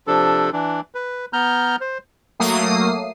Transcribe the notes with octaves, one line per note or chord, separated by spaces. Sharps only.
C3 F3 D4 A4
E3 D4
B4
B3 A#5 F6 G6
C5
F#3 A3 A#3 D#6 C7 D#7